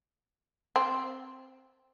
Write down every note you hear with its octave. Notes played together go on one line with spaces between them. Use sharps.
C4